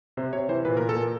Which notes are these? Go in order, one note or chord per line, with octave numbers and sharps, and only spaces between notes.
C3 C5
C3 C#5
E3 C5
A#2 B4
A#2 A#4
A4
A#2 A#4